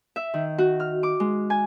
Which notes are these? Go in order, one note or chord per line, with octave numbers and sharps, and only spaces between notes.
E5
D#3
F#4
F6
D6
G#3
G#5